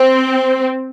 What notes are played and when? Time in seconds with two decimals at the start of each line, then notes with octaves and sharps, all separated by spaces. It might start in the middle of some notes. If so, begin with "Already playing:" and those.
Already playing: C4